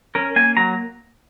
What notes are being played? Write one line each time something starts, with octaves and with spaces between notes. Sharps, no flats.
C#4 A#4
A#3 G#5
F#3 A#5